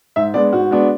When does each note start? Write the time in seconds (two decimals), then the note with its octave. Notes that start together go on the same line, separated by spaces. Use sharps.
0.16 G#2 E5
0.34 G#3 B3 D4 D5
0.53 G#2 F#4
0.71 G#3 B3 D4